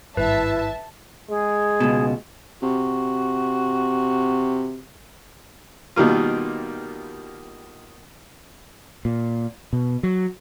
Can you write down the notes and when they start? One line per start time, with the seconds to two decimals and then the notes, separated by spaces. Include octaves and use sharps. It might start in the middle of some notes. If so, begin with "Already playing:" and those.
0.17 G#1 G2 E4 B4 E5 A5
1.30 G#3 G#4
1.80 C#2 B2
2.63 C3 F#4
5.96 B2 D#3 G3 A#3 F4
9.05 A#2
9.73 B2
10.03 F#3